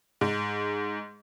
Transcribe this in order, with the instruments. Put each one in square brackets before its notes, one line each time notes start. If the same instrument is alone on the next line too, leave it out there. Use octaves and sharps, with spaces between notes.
[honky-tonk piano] G#2